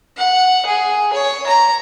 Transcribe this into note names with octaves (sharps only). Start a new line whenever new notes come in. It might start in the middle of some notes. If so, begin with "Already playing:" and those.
F#5
G#4
C#5
A#5